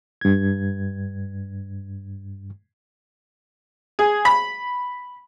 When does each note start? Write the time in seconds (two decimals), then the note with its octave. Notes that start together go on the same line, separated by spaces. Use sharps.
0.21 G2 G#6
3.99 G#4
4.25 B5